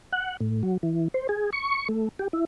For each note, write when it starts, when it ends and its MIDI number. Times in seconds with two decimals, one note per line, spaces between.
0.12 0.37 78
0.40 0.62 45
0.63 0.77 54
0.83 1.08 52
1.14 1.27 72
1.29 1.50 68
1.53 1.88 85
1.89 2.08 57
2.19 2.28 67
2.33 2.45 64